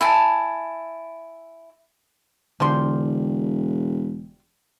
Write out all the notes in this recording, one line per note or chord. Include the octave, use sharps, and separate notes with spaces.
E4 G#5 A5
E1 D3 F3 G3 C6